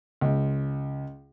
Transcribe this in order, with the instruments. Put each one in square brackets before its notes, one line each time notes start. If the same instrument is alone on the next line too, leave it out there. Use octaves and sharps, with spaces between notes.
[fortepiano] C#2